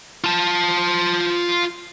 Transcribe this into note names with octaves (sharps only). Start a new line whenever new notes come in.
F4 A5